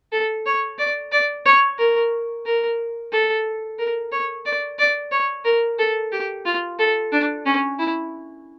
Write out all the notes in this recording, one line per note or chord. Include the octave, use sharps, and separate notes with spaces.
A4
C#5
D5
D5
C#5
A#4
A#4
A4
A#4
C#5
D5
D5
C#5
A#4
A4
G4
F4
A4
D4
C#4
E4